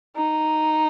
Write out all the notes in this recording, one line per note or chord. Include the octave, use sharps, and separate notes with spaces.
D#4